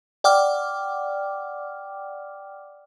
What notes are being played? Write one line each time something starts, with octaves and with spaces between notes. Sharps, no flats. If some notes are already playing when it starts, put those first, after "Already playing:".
D5 F#5 G5 D6 F6